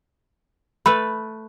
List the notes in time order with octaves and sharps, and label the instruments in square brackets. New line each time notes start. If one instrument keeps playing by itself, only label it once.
[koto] A3 A4 B4 [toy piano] B5